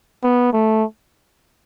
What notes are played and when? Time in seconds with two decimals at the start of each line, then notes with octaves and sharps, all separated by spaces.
0.24 B3
0.53 A3